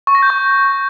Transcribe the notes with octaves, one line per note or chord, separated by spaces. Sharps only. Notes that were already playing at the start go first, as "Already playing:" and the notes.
C#6
A#6
G6
C#6